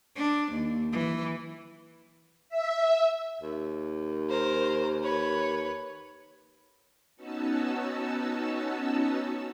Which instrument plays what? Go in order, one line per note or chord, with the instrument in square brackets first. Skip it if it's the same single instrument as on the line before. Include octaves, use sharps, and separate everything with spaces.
[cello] D4
D#2
E3
[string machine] E5
[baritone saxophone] D#2
[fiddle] A#4 C5
B4 C#5
[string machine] B3 C#4 D#4 F#4 A5 E6